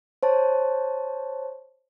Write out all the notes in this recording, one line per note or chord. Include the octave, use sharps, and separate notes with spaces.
C5 C#5 A5